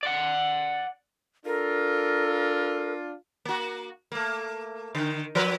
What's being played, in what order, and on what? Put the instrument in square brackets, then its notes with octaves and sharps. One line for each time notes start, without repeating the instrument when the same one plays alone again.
[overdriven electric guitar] D5 F#5
[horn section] D4 F4 [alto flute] A4 [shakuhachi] A#4
[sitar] A#3 F#4
A3 A#3
D3 D#3
F3 A#4 B4